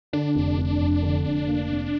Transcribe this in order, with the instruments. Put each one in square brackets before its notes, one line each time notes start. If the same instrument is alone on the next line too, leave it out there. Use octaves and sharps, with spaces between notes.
[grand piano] D3 [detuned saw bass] D4
[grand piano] F1
F1
F2
D3
F1
A#3
C3